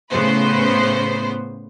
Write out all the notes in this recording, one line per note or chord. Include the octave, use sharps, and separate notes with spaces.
A2 C#3 B3 B4 C5